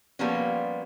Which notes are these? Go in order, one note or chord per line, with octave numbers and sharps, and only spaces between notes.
F3 G3 A#3 B3 C#4